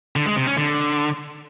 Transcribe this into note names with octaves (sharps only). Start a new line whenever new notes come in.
D3
G#3
C3
C#4
D3